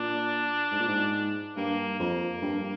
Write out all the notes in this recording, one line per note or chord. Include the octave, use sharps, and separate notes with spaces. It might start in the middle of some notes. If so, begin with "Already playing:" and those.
Already playing: A#2 D4
G#2
A#2
G#2
G2 A#3
F2 A#3
G2